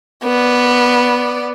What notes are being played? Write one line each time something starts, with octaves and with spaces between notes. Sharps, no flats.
B3 D5